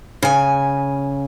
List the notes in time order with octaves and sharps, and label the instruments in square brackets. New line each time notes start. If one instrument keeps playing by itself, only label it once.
[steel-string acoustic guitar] C#3 G#5